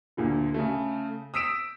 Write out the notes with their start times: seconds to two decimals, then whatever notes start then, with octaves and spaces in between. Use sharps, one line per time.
0.17 D2 A#2 D3
0.54 C#3 A3
1.34 D#6 E6 B6 D7 E7